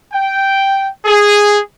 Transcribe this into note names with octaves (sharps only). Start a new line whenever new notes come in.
G5
G#4